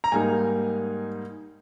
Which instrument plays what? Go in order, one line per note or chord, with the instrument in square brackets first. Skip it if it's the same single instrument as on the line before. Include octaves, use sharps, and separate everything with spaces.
[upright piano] A#5
G#2 G3 A#3 D#4 G#5